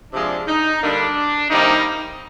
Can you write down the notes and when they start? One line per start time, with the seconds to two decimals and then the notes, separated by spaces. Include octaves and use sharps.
0.13 C3 F3 G#3 D4
0.47 D#4
0.82 D3 G3 A#3 D4
1.50 C3 D#3 G3 A#3 D#4